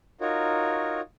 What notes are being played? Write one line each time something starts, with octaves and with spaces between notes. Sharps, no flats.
D#4 F4 F#4 A#4 C#5